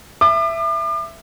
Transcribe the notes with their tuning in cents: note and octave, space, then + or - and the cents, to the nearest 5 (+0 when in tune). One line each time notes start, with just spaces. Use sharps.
E5 +10 D6 +40